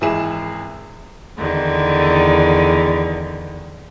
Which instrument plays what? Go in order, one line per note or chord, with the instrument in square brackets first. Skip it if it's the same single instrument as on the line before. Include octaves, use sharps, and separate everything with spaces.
[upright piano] G#1 E3 G#3 E4 G#4 E7
[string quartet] E2 D3 D#3